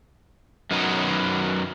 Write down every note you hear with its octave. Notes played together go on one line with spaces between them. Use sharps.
F#2 D#3 F#3 B3 D#4